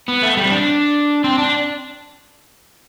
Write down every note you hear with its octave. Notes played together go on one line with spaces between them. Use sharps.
B3
A3
G3
C4
D4
C4
D4